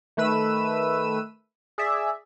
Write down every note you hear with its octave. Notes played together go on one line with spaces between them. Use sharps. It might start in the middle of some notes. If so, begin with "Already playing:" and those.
D#3 A3 B4 E6 D#7
G#4 D5 E5